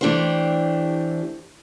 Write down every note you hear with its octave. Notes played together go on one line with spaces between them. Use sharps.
E3 A3 D4 G4 C5